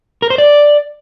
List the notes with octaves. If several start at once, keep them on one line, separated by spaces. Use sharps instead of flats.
A#4
C5
D5